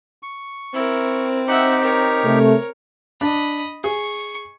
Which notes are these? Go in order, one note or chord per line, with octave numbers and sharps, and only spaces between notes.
C#6
C4 E4 A#4
D#4 G4 E5 F#5
A#4 C#5
C3 A3
D4 D#5 B5
G#4 C#6